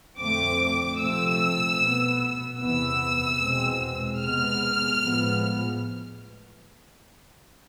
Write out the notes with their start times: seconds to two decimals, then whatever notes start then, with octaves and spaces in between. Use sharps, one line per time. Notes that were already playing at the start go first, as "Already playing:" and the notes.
0.18 F2 D3 A3 C4 D6
0.99 C3 F3 A3 C4 E6
1.78 B2 B3
2.59 E2 C3 E3 B3 E6
3.39 E2 B2 G#3 C4
4.19 C3 G#3 B3 F6
4.99 A2 F3 G#3 B3